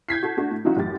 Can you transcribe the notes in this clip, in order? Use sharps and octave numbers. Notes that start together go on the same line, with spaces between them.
G6 G#6 B6 C7
F#4 A4
A3 D4 F#4
A2
E3 F#3 C#4 D#4 F4 F#4
A1 F#2 A2 G4 A6